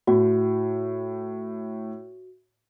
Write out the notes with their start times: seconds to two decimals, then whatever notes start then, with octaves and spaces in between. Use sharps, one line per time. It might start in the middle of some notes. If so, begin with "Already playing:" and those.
0.07 A2 F#4